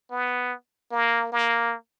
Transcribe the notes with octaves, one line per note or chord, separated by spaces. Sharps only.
B3
A#3
A#3